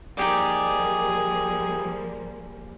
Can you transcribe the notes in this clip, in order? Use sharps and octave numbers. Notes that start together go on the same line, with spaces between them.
F3 G3 A#3 D#4 G4 G#4 D5